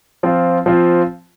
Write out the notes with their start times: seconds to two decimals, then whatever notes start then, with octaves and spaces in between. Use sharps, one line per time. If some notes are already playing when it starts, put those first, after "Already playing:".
0.23 F3 C4 F4
0.66 F3 C4 F4